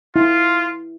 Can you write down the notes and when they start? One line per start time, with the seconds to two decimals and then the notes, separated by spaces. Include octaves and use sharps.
0.16 E4 F4